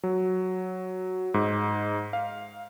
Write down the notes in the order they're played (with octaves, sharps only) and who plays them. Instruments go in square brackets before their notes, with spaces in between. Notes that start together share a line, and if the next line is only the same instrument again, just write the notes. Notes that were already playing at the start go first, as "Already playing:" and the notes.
[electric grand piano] F#3
G#2
F5